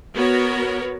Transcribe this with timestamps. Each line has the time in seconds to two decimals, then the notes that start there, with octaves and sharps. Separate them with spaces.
0.15 B3 F#4 A#4 C#5